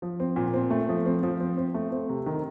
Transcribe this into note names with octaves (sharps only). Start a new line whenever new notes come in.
F3
C4
A#2
C4
A3
F3
C4
F3
C4
C4
A3
C4
C3
D#3